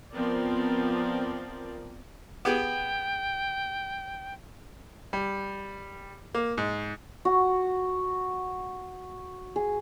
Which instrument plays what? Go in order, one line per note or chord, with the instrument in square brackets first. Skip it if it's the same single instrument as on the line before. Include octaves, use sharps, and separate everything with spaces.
[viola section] F3 B3 C4 A#4 D5
[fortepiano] B3 G4 G#4 [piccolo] G5
[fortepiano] G3
A#3
G#2
[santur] F#4
G#4